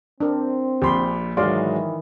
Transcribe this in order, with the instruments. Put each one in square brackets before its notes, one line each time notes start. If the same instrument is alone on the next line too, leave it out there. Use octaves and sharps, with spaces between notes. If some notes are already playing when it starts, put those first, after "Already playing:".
[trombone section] C4 [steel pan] D4 A#4
[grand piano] A#1 A#2 B5 [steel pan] G4 C6
[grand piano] G#2 F#3 G#3 [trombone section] D#3 E3 [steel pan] D5 F5 C6